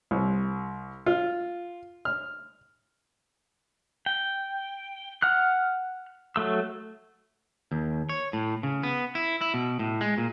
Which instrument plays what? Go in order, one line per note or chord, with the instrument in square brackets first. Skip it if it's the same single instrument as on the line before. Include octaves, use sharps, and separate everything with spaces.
[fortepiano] C2
F4
F6
[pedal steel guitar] G5
F#5 F6 F#6
F#3 A3 E6
[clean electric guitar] D#2
C#5
A2
C#3
B3
E4
E4
B2
A2
G#3
A#2